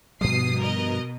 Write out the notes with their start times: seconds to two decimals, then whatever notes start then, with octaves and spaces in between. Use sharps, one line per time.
0.21 G2 B2 F3 G3 D#6 C7
0.60 A#4 D#5